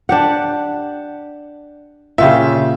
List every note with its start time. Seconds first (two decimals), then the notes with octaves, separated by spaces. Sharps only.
0.09 D4 G4 F#5
2.18 A#2 C#3 F4 G4 E5